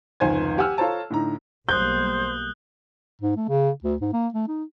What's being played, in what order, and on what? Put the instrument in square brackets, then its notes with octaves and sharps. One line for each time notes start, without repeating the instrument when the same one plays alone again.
[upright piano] F1 C#2 D#3 C5 G#5 G#6
G4 F#5 G#5 E6 F6
F4 A4 C5 C#5 A5 A#5
A2 D3 D#4 A#5
[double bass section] B1 G3 A#3 [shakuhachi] C5 [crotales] D#6 F#6 G7 [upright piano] G6
[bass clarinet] G#2
A3
C#3
D2
G#2
A#3
A3
D#4